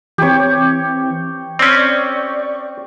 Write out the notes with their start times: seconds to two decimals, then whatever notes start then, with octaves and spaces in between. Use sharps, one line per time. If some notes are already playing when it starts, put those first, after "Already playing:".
0.18 E3 C4 G4 C#5
1.59 C4 C#4 D5 C#6